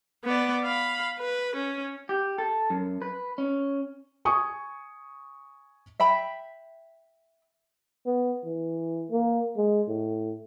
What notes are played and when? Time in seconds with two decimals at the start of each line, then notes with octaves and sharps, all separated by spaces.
0.24 B3 D5
0.64 F5 B5
1.19 B4
1.56 C#4
2.09 G4
2.38 A4
2.70 F#2
3.02 B4
3.38 C#4
4.25 G#5 C#6 D#6
6.00 E5 G5 B5
8.06 B3
8.45 E3
9.11 A#3
9.56 G#3
9.88 A2